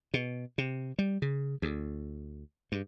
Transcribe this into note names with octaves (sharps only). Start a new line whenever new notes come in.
B2
C3
G3
C#3
D2
G2